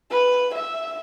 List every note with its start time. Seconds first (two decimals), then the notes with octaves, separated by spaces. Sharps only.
0.11 B4
0.54 E5